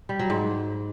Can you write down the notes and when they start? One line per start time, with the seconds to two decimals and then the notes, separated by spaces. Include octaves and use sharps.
0.09 G3
0.19 F#3
0.30 G#2